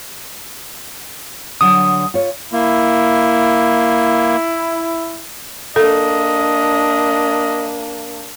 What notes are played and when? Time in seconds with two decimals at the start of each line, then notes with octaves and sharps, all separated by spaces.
1.61 D3 F#3 D#6
2.14 F4 C#5
2.52 A#3 E4
5.76 A#3 D4 A4 D#5